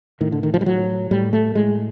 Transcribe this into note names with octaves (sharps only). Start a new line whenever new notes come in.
A2 D#3
D3
D#3
F3
G3
A2 F#3
A2 G3
A3
A2 G#3